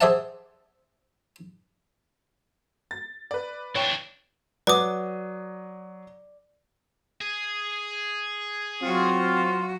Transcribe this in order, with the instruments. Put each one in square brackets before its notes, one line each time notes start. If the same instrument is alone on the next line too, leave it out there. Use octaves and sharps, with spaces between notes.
[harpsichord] G#4 C5 D5 E5 F#5 A5
[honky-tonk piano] A6
B4 D5
[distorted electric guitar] E3 D4 [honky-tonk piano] C#5 G5
[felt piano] F#3 D#6 [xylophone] B4 D6 [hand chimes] D5
[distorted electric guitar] G#4
[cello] F#3 F#4 [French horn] C4 [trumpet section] F4